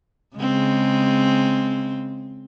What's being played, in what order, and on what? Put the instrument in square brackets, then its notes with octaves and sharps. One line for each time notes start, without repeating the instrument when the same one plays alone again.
[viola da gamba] C#3 G#3 C4